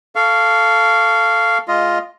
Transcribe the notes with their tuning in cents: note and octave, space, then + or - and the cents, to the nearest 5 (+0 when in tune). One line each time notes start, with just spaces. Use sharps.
A4 +0 F5 -10 C#6 +25
G#3 +10 F4 +0 D#5 +0